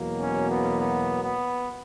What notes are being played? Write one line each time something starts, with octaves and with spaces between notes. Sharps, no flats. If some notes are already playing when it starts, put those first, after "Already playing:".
Already playing: E2 B2 F#3 A#3
C#4
B3
B3
B3